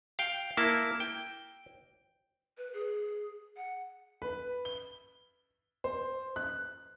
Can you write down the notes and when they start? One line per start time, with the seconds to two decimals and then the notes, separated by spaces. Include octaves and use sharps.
0.19 F5 G5
0.57 A#3 E4 A5
1.00 G5
2.58 B4
2.74 G#4
3.56 F#5
4.22 B4
4.65 G7
5.84 C5
6.36 F#6